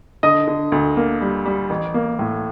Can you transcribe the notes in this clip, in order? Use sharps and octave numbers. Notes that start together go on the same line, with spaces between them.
D3 D#5 D#6
D3
D2
A#3
G3
G3
A1
A#3
A2